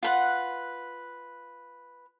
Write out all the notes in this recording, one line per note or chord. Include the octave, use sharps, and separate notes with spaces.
F4 B4 F#5